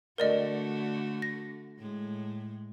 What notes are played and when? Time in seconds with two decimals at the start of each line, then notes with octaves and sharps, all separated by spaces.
0.18 D3 A3 F#4 A#4 D5 D#5
1.22 A#6
1.78 A2 G#3